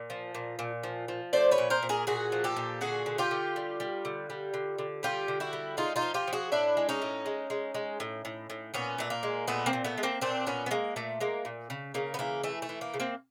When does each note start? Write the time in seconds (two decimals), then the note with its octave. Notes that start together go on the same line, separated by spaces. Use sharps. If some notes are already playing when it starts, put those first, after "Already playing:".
Already playing: A#2
0.10 F3
0.35 A#2
0.59 A#2
0.83 F3
1.08 F3
1.33 A3 C5 D5
1.51 B4 C#5
1.58 A#2
1.70 A#4 C5
1.83 A#2
1.89 G#4 A#4
2.07 A#2 F#4 G#4
2.32 F3
2.44 G4 A4
2.56 A#2
2.81 D3 F#4 G#4
3.06 D3
3.18 F4 G4
3.31 D3
3.56 G3
3.80 G3
4.05 D3
4.30 G3
4.54 D3
4.78 D3
5.03 G3 F4 G4
5.28 D3
5.40 E4 F#4
5.53 G3
5.77 G#3 D#4 F4
5.96 D#4 F4
6.02 F3
6.14 F4 G4
6.28 F3
6.33 F#4 G#4
6.52 A2 D4 E4
6.77 G#3
6.89 C#4 D#4
7.02 A2
7.26 G#3
7.50 G#3
7.74 G#3
8.00 A2
8.25 A2
8.50 A2
8.74 A#2 B3 C#4
8.98 A#2 A3
9.10 A#3
9.23 G#3
9.47 A#2 A3 B3
9.66 A#3 C4
9.73 A#2
9.84 A3 B3
9.98 G#3
10.03 A#3 C4
10.21 A#2 C4 D4
10.46 A#2 B3 C#4
10.66 B3
10.71 G#3 A#3
10.96 A#2 A3
11.20 G#3 A#3
11.45 A#2
11.70 C#3
11.94 C#3 A#3
12.14 B3
12.19 E3 A#3
12.43 E3 A3
12.62 A3
12.69 E3
12.81 A#3
12.94 C#3
13.00 A#3 C4